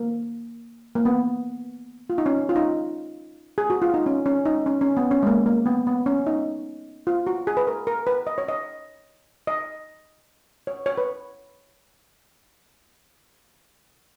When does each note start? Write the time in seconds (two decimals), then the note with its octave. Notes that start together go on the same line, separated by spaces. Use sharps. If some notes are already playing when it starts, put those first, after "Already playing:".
Already playing: A#3
0.95 A#3
1.05 B3
2.10 F4
2.18 D#4
2.26 C#4
2.49 F4
2.56 D#4
3.58 G#4
3.70 F#4
3.82 F4
3.94 D#4
4.06 C#4
4.26 C#4
4.45 D#4
4.66 C#4
4.81 C#4
4.97 B3
5.11 C#4
5.23 G#3
5.27 A#3
5.46 A#3
5.66 B3
5.87 B3
6.06 C#4
6.27 D#4
7.07 F4
7.27 F#4
7.47 G#4
7.57 B4
7.67 A#4
7.87 A#4
8.07 B4
8.27 D#5
8.38 C#5
8.48 D#5
9.47 D#5
10.67 C#5
10.86 C#5
10.98 B4